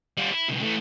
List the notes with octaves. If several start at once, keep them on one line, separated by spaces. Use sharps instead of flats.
G3 F4
E4
C#2 B2
E3 A3